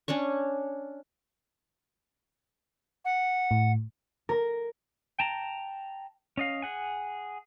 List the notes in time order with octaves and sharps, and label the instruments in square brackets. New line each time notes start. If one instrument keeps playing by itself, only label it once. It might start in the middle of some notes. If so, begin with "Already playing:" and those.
[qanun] C#4 D4 C#5 C#6
[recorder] F#5
[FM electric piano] A2
[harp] A#4
[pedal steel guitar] G5 A5 A#5
C#4 D#5 F5
G#4 F#5 G#5